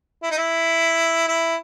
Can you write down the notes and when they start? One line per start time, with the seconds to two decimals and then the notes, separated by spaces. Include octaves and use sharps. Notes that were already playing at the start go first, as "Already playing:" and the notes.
0.23 E4
0.31 D#4
0.38 E4
1.28 E4